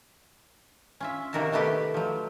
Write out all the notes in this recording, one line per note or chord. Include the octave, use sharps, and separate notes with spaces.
C#4 F4 E5
C3 D#3 A#3 F#4 A#4 A5
D#3 A3 B3 G4 B4
F3 F#3